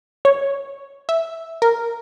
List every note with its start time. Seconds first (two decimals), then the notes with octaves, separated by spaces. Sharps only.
0.25 C#5
1.09 E5
1.62 A#4